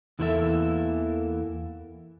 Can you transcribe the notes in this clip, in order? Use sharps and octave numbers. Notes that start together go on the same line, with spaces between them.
E2 E3 A#3 E4 A4 E5